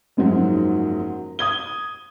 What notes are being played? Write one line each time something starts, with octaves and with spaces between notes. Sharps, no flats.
F#1 G#2 F3 F#3
D#6 G#6 G7